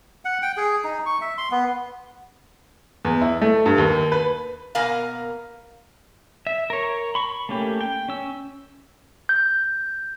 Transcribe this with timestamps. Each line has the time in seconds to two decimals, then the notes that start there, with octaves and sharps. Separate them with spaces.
0.25 F#5
0.42 G5
0.57 G#4
0.84 D#4
1.06 C#6
1.21 E5
1.38 C6
1.51 B3
3.05 E2
3.21 E4
3.42 A3
3.66 G2
3.78 D#2
4.12 B4
4.75 B2 A#3 B3 A#4 F5 G#5
6.47 E5
6.70 A#4 C#5
7.15 B5 C#6
7.49 A3 A#3 C#4 G4
7.81 G5
8.08 C#4 E6
9.29 G6